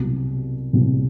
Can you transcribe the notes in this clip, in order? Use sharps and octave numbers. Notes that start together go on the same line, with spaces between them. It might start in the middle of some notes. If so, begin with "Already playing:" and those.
Already playing: C2 B2 F#3
C2 B2 F#3